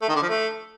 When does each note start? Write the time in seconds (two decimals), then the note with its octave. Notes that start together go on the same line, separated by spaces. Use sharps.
0.02 A3
0.09 D#3
0.15 D3
0.22 F3
0.29 A3